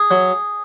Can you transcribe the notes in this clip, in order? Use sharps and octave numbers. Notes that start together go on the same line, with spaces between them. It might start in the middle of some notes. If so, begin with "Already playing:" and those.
Already playing: G#4
F#3